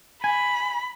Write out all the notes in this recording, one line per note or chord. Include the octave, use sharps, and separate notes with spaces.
G#5 B5